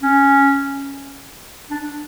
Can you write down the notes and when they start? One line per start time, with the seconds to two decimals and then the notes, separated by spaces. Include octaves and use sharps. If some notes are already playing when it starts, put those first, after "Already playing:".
0.02 C#4
1.70 D4